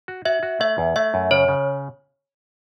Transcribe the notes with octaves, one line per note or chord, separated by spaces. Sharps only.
F#4
F#4 E5
F#4
A3 E5
E2
A3 E5
F#2
C#3 C#5
C#3